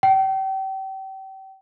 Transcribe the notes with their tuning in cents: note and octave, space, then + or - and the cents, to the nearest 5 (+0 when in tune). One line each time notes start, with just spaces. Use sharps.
G5 -35